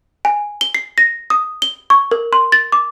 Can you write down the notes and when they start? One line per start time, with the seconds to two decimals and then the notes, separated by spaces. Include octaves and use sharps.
0.25 G#5
0.61 G7
0.75 C7
0.98 A#6
1.30 D#6
1.62 G7
1.90 C#6
2.11 A#4
2.33 C6
2.52 A6
2.72 D6